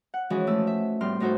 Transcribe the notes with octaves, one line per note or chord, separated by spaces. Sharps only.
F#5
E3 F3 G#3 C#4 F#4 G#4
F3 A3 A5 E6
E5
A2 G3 B3 C4 C6 F6
A2 D#4 F#4 A4 C5